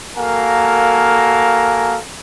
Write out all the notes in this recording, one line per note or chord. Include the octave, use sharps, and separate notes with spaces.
A#3 F#4 A4 A#4 F5 G#5